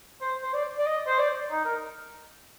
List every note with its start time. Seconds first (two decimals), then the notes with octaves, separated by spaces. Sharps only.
0.21 C5
0.42 C5
0.53 D5
0.78 D5
0.86 D#5
1.07 C5
1.19 D5
1.51 D#4
1.65 A#4